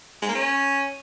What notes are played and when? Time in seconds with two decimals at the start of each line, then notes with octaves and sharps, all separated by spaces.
0.22 G#3
0.29 A#3
0.35 C#4